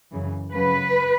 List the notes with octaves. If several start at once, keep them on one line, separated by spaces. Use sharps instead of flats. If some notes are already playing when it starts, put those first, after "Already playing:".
F#2 C#3 E3
F#2 C#3 F#3 B4